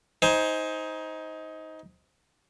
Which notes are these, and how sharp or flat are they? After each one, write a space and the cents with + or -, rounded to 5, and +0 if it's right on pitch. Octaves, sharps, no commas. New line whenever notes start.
D#4 +20 C5 +0 G#5 +0